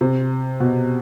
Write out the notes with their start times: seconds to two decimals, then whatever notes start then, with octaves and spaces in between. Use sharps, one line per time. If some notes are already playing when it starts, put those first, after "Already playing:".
0.01 C3
0.60 B2